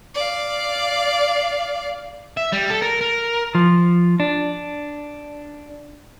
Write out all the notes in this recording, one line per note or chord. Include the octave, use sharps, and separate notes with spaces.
D5 F5
E5
G3
A4
A#4
A#4
F3
D4